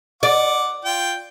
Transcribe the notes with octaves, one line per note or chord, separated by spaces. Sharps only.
D5 F#5 D6
F4 G5